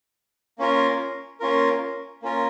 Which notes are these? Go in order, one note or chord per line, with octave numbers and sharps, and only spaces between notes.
A#3 C#4 F4 A#4
A#3 C#4 F4 A#4
A#3 C#4 F4 A#4